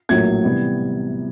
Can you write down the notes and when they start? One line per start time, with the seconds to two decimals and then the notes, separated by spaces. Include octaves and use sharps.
0.09 A#1 A2 F#3 A#3 G#6
0.44 C3 E3 G3 B3